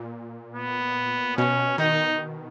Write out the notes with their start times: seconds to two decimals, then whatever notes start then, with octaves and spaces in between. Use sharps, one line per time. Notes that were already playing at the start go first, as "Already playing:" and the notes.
Already playing: A#2
0.55 B3
1.37 B2 C#4
1.78 D#3 D#4